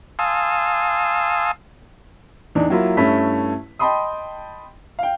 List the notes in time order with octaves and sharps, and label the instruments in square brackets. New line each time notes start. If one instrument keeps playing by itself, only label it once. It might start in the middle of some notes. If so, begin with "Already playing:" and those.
[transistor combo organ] F5 G#5 A5 C6 D#6 E6
[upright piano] E2 D4 D#4
F#3 A#3 E4 F4
G2 A3 C#4 E4 B5 B6
D#5 G5 A5 B5 C6 D#6
F5 G5